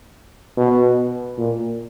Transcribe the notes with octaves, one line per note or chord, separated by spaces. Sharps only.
B2
A#2